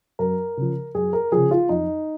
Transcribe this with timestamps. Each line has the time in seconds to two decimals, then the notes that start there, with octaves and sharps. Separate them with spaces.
0.19 F#2 A#4
0.57 C#3 F3
0.94 F#2 G#4
1.13 A#4
1.32 C#3 F3 G#4
1.51 F4
1.69 F2 D#4